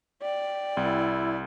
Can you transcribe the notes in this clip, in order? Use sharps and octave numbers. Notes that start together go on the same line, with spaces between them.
D5 G5
C2 E4